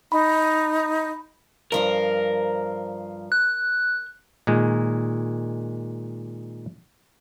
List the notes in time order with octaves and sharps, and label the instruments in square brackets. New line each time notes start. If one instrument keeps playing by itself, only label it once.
[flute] D#4 [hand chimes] B5
[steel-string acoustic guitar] G2 F3 C5 [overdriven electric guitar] A#4
[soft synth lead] F#6
[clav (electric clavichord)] A#2 D#3 G#3